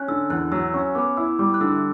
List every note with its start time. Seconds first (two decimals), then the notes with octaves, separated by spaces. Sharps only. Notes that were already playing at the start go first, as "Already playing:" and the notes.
Already playing: C#4 F#6
0.08 D3 E6
0.30 E2 F#6
0.52 F#3 E6
0.74 C#4 C#6
0.95 B3 D6
1.17 E4 E6
1.39 G3 D6
1.54 F#6
1.61 D3 E6